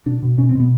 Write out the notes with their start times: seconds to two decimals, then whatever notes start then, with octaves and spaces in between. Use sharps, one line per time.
0.06 B2 D4
0.22 B2
0.38 B2 C#4
0.49 C4
0.55 B2 B3